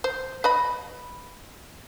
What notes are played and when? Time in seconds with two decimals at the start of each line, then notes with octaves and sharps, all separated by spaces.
0.04 C5
0.44 B4 D#5 B5